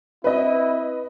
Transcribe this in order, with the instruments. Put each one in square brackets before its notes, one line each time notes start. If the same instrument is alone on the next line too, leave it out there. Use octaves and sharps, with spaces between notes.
[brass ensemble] C4 E4 [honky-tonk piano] B4 D#5